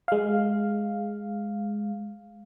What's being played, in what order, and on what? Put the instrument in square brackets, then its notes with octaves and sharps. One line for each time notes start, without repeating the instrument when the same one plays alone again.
[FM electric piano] G#3 F5